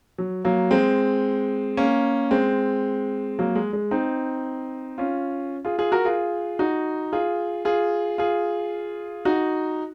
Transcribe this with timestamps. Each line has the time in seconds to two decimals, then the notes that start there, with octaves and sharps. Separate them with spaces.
0.18 F#3
0.45 F#3 A#3
0.71 G#3 C4
1.77 A#3 C#4
2.31 G#3 C4
3.39 F#3 A#3
3.55 G#3
3.73 G#3
3.91 C4 D#4
4.98 C#4 F4
5.65 F4 G#4
5.78 F4 G#4
5.92 F#4 A#4
6.05 F4 G#4
6.59 D#4 F#4
7.13 F4 G#4
7.65 F4 G#4
8.18 F4 G#4
9.25 D#4 F#4